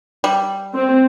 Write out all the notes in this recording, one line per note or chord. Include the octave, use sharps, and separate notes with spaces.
G3
C4